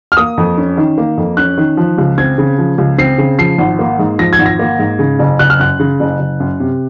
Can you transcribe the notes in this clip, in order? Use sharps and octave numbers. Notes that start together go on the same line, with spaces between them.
F6
A#3 D#6
F2
C#4
D#3
A#3
F2
C#4 F#6
D#3
F3
C#2
C4 G#6
C#3
F3
C#2
C4 C7
C#3
F3 C7
G#1
A#3
G#2
F3 A#6
G#6
G#1
A#6
A#3
G#2
C#3
F#1
F#1 F#6
F6
F#2 F#6
C#3
F#1
F#1
F#2
C3